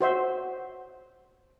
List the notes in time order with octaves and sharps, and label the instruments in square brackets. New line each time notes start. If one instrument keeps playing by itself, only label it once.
[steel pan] F#4 C5 E5